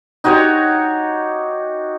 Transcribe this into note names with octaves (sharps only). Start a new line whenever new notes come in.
D#4 F#4 G4 C#5